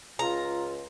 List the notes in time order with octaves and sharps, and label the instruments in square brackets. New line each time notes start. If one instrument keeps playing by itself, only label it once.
[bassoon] C#2 [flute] F4 [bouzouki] A#5